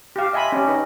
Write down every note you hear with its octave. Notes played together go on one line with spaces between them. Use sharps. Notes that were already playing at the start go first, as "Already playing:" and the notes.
G4 F5
D#5 E5 G#5 A5 B5 C6
C#4 G4 C#5 D#5 A5
D#4 B4 D#5